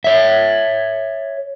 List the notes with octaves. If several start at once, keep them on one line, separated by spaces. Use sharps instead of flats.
C#5 E5